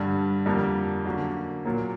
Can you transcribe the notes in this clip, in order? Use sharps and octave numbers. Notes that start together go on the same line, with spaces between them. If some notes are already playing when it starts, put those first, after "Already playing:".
Already playing: G2 D3 G3
F2 D3 G3 A#3
D3 F#3 A#3 C#4
A#2 F#3 A#3